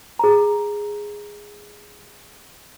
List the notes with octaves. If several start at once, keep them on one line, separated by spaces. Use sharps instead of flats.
G#4 A#5